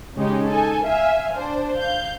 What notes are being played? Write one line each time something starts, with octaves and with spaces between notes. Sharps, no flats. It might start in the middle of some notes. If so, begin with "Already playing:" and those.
C#3 G#3 C#4 D#4 G4
D#4 A4 G#5
E5 F5 G#5
D4 C5
F5 G6